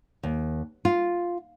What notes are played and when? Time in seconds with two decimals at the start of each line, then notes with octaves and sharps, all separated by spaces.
0.23 D#2
0.85 F4